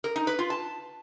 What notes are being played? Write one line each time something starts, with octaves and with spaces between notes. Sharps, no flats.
A#4
D#4
B4
F4
A5